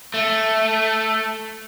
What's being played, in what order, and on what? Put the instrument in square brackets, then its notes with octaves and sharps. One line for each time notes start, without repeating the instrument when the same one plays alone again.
[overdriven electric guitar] A3